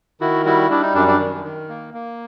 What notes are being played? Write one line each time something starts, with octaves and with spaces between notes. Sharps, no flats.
D#3 E4 F#4
G3 E4 F#4
G3 D4 E4
D#4
F#2 D4
D4
D#3
D#3
A#3
A#3